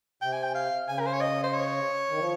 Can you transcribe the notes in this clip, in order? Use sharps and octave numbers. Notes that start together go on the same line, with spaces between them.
C3 G5
G#5
G5
F5
C#3 G#5
A#4
C5
C#5
D#5
C5
C#5
D#3
F3